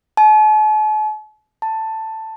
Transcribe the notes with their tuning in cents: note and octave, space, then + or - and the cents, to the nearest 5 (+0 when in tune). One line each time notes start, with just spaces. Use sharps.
A5 -45
A5 +10